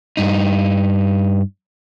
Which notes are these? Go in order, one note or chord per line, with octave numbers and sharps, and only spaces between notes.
G2 D#4